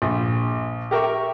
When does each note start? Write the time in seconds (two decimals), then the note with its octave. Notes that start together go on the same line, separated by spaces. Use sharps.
0.02 A#1
0.91 G4 A#4 E5 C#6